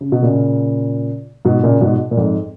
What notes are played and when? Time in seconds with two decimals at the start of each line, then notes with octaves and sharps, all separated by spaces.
0.01 C#3
0.12 B2
0.22 A#2 C#3
1.45 G#2 B2
1.63 A#2 C#3
1.81 G#2 B2
2.11 A#2
2.17 F2 G#2